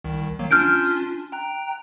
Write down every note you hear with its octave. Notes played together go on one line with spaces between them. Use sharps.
C2 D#3
D#3 F#3 A#3
C#4 D4 F4 F6 G6 D7
G5 A#5 F#6